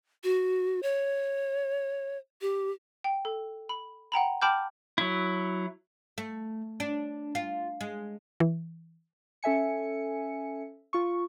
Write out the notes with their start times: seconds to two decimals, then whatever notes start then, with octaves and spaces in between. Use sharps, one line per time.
0.24 F#4
0.83 C#5
2.41 G4
3.04 G5
3.25 A4
3.69 B5
4.12 F#5 G5 A#5 B5
4.42 G5 A5 B5 D6 F6 G6
4.98 F#3 E4
6.18 A3
6.80 D4
7.35 F4
7.81 G#3
8.40 E3
9.43 C#4 A4 E5 G#5 C#7
10.93 F4 C#6